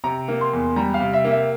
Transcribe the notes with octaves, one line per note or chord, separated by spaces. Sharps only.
C3 A#5
A#3
C6
E2
G3 A#5
F5
C3
E5
A#3
E5